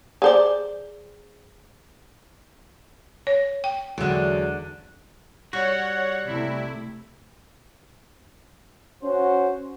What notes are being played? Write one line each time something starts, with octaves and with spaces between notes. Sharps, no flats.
G#4 C5 D5
C#5
G5
E2 D3 F#3 G#3 F#4
G3 F#4 C#5 F#5
C3 A3 E4
C#4 F#4 C5